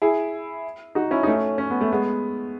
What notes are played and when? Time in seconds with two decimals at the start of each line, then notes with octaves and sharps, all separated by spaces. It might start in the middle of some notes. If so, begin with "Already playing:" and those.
0.02 E4 G#4
0.95 D#4 F#4
1.11 C#4 E4
1.23 D#4
1.27 A3 C#4
1.58 C#4
1.71 B3
1.81 A3
1.92 G#3 B3